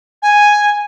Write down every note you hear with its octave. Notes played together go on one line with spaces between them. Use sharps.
G#5